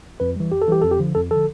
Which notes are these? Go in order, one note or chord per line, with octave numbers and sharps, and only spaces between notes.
F2 B4
E3 G3
F2 G4
A4
E3 G3 G4
F2 A4
G4
D3 F3
F2 A4
D3 F3 A4